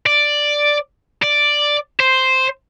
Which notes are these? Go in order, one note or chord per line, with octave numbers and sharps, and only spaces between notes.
D5
D5
C5